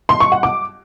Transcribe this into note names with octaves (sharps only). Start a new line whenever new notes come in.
C6
C#6
F#5
D6